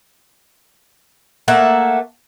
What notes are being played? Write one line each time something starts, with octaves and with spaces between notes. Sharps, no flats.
A3 A#3 E5 F#5